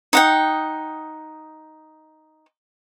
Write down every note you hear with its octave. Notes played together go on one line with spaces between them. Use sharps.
D#4 F#5 G5